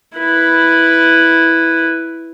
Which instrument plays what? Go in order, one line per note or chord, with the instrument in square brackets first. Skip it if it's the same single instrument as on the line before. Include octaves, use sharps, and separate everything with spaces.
[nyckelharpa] E4 B4